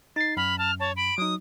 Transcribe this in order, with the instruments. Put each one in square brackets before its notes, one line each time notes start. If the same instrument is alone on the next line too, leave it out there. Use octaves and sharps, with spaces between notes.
[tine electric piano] D#4 C7 [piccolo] A6
[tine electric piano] F#2 [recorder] B5 [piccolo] F6
[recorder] A5 [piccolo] F6
[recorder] C#5 [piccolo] A5
[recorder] B5 [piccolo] D7
[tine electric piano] F#3 D#4 [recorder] D#6